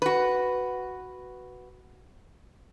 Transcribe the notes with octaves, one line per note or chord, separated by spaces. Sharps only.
F#4 B4